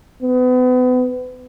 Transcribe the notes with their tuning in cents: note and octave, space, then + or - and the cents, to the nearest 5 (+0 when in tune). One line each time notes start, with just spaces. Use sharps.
B3 +35